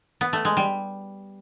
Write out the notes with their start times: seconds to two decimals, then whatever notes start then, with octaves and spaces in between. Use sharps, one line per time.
0.21 B3
0.33 A3
0.45 G#3
0.57 G3